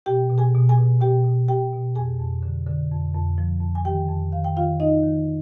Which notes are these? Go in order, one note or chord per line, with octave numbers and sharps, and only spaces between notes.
B2 G4 G5
B2
G#4 G#5
B2
G#4 G#5
B2
B2 G4 G5
B2
B2 G4 G5
B2
F2 G#4 G#5
F2
D3
D3
F2
F2
F3
F2
G#5
D#3 G4 G5
F2
D#3 F5
G5
D#3 F4 F5
F2 D#4 D#5
D#3